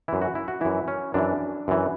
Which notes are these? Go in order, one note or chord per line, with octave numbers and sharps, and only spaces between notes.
F#2 E3 E4
F#4
E4
F#4
F#2 E3 E4
C#4
F#2 E3 D4
F#2 E3